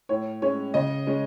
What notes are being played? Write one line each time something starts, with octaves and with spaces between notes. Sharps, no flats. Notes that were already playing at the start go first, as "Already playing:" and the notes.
A2 C#5
G#3 C#4 C#5
C#3 D#5
G#3 C#4